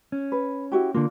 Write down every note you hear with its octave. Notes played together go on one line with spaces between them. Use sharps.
C#4
B4
E4 F#4 G4
D3 A#3 F4 D5